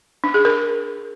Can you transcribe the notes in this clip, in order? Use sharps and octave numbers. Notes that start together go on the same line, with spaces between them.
D4
G#4
A#4